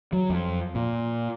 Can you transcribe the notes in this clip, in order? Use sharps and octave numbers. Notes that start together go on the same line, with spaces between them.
F#3
F2
A#2